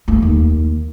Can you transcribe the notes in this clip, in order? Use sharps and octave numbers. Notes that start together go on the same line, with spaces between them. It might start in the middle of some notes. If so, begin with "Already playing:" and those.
A3 A#3
D#2